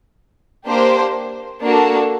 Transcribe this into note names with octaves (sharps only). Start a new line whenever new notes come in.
A#3 D4 G4 C5
A#3 D4 F#4 A4